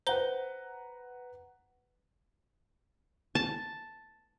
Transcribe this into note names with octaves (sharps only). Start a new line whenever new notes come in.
B4 C5 F#5 A#5 G7
A5